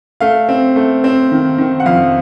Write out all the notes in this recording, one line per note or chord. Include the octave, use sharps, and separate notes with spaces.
A3 F5
C4
A3
C4
D#3
D#3
F#5
F2 F5